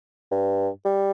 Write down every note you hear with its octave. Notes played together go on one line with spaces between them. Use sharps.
G2
G3